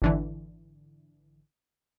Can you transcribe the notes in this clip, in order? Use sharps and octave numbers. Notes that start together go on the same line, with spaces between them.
G#1 D3 E3